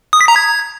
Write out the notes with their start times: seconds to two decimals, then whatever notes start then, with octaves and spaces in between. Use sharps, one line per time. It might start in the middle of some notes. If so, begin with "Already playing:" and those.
0.13 D#6
0.21 B6
0.28 A#5
0.36 G#6